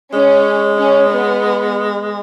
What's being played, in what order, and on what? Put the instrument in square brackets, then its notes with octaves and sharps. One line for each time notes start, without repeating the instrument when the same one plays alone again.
[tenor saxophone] G#3 [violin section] C#4
[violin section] C#4
B3